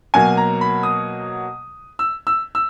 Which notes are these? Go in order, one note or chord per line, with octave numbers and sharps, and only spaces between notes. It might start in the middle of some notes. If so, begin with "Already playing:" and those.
B2 F#3 A#3 G#5
A#5
B5
D#6
E6
E6
E6